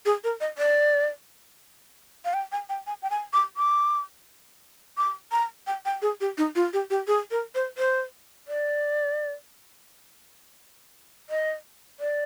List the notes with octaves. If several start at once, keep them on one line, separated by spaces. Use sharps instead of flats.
G#4
A#4
D#5
D5
F5
G5
G#5
G5
G#5
G5
G#5
D6
D6
D6
A#5
G5
G5
G#4
G4
D#4
F4
G4
G4
G#4
A#4
C5
C5
D5
D#5
D5